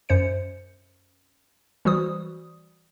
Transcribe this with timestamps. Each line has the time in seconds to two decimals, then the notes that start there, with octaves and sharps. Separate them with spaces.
0.09 F#2 C5 C#7
1.85 E3 G3 F#4 C5 D#6